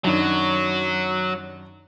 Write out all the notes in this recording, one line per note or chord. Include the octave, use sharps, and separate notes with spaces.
F#2 D#3 F#3 D4 F#4